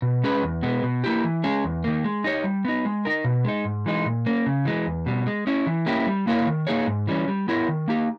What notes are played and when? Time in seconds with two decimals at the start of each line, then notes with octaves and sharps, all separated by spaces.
0.02 B2
0.23 G#3 C#4 G#4 B4
0.42 E2
0.63 B2 G#3 B3
0.83 B2
1.04 A#3 E4 G4
1.24 E3
1.44 G#3 C#4 G#4
1.64 E2
1.84 D#3 A#3
2.04 G#3
2.24 D#4 G4 C#5
2.44 G3
2.65 B3 D#4
2.85 G#3
3.05 D#4 A#4
3.24 B2
3.45 G#3 D#4
3.65 G#2
3.86 E3 G#3 D#4
4.05 A#2
4.26 A#3 C#4
4.46 C#3
4.65 E3 G#3
4.87 E2
5.06 B2 G3
5.27 G#3
5.47 C#4 E4
5.67 E3
5.86 A#3 C#4 E4 G4
6.07 G3
6.27 A#3 E4 A#4 C#5
6.47 D#3
6.67 A#3 D#4 G#4 C#5
6.87 G#2
7.07 E3 G3 C#4
7.28 G3
7.48 B3 E4 A#4 C#5
7.69 D#3
7.88 A#3 D#4 G4